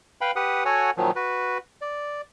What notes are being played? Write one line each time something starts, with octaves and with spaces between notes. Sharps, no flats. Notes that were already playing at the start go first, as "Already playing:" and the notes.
B4 F5 G5 B5
G4 B4 F#5 D#6
F#4 A4 C#5 F#5 G#5
A#2 D#3 F3 F#3
F#4 B4
D5